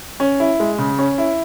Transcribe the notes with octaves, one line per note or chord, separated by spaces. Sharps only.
C#4
E4
G#3
C#3
C#4
E4